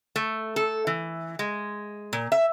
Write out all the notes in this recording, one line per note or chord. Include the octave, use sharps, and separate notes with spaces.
A3
A4
E3
G#3
A#2
E5